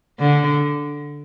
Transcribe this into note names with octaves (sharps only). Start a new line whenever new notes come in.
D3